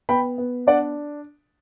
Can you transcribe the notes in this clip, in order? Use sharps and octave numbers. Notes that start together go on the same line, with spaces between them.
B3 G5 B5
B3
D4 D5 F#5